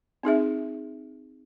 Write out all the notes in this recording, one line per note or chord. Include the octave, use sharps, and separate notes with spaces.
C4 D#4 G#4 E5